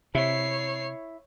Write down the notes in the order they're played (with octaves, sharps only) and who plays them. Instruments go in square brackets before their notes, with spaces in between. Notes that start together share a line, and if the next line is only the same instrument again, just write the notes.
[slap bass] C3 [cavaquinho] E4 [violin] C#5 C7